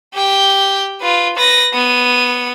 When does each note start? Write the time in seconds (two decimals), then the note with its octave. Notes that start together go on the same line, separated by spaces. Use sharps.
0.15 G4 G5
1.01 F4 B4
1.36 B4 A#6
1.74 B3 D#7